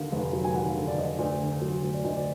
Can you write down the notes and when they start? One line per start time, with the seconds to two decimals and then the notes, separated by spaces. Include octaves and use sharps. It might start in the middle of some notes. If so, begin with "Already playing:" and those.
Already playing: D#2 D3 F5
0.12 F1
0.33 F#3
0.44 G#5
0.54 D#2 F#5
0.66 F5
0.77 D3
0.87 D5
0.98 F1 D#5
1.08 D5
1.19 D2 D5
1.40 D3
1.61 F#3
1.83 D2
1.94 D5
2.04 D2 D#5
2.16 D5